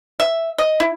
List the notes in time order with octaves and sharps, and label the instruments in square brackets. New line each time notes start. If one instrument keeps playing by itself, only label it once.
[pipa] E5
D#5
E4